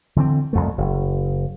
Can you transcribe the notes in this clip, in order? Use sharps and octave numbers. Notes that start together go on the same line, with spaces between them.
D3 E3 A3 C4
C2 F2 A3
F#1